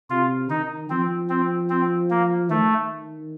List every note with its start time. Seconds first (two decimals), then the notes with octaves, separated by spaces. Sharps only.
0.10 C3 F4
0.50 D#3 D#4
0.90 F3 C4
1.30 C4
1.70 C4
2.10 A#3
2.50 D#3 A3